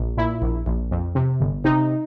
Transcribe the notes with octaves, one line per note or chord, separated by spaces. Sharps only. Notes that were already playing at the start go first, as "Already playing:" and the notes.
Already playing: A#1
A#2 E4
A#1
A#1
F2
C3
G1
C3 D#4